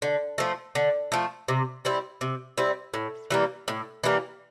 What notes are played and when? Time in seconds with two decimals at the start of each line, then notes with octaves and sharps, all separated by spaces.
0.02 D3
0.38 F3 A3
0.75 D3
1.12 F3 A3
1.48 C3
1.85 G3 C4 E4
2.21 C3
2.57 G3 C4 E4
2.94 A2
3.30 E3 G3 A#3
3.68 A2
4.04 E3 G3 A#3